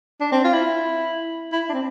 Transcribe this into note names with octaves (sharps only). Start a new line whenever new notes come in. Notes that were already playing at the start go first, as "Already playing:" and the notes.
D4
C4
F4
E4
E4
D4
C4